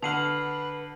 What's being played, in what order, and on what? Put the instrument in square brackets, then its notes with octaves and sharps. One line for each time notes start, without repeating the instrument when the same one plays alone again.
[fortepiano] D3 F#5 F6 [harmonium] B4 [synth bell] A5 C7 F#7